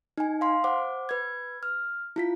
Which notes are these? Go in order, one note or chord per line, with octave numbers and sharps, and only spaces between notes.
D#4 G#5
F5 C6
C5 F#5 D6
B4 G#6
F6
E4 F4 B6